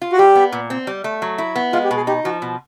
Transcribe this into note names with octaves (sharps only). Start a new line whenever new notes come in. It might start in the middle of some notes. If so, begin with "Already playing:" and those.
F4
F#4
G3 G4
B3
A#2
C4
G3
A3
F#3
E4
B3
G#3 F4
G4
B2
G#4
D#4 G4
F3 F#4
B2